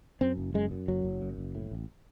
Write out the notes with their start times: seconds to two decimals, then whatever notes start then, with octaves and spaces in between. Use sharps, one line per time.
0.21 F#2 C4
0.38 F#1
0.54 F#2 G#3
0.71 F#2
0.88 F#1 F#3
1.05 F#1
1.22 F#2
1.38 F#1
1.55 A2
1.72 A1